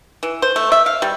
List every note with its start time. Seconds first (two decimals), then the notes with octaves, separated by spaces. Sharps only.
0.23 E3
0.42 C5
0.56 A3
0.72 E5
0.86 F5
1.02 G3